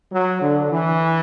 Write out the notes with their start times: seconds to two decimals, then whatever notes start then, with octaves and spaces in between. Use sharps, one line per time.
0.11 F#3
0.41 D3
0.70 E3